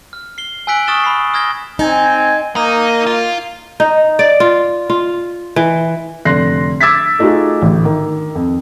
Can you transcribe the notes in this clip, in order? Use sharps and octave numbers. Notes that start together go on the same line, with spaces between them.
F6
C7 G7
G#5 E6 F#6 B6 D7 F#7
C#6 D#6 F6 A6 E7 G7
B5 C7
D#6 F6 G#6 A#6 G7
C4 D#4 G#5
A#3 D#4
F4
D#4
D5
F4
F4
E3
F1 D3 C6 F#6 A#6 C7
D6 E6 G#6 A6 B6
A3 D#4 F4 F#4 G#4
A1 D3
D#3
F2